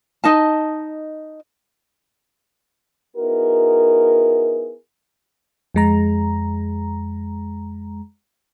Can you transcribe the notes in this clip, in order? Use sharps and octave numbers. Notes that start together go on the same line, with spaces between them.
D#4 D#5 A5
B3 D#4 E4 F#4 G#4 A#4
F2 G#3 A#5